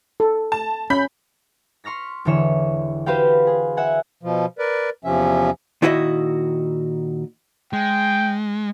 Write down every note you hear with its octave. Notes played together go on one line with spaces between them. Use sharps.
A4
A5
C#4 B5 G6 B6
C6 C#6 F6 A#6 B6
E1 D3 E3 C#5 E7
F#4 G4 B4 C5 F5 G5
G#4
E5 F#5 G#5
B2 F3
A#4 B4 D5
E2 C3 F3 C#4 E5
A#2 D#3 E4 F#4 C#5 D#5
G#3 G5